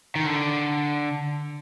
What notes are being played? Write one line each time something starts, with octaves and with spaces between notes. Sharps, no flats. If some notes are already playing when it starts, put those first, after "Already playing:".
D#3
D3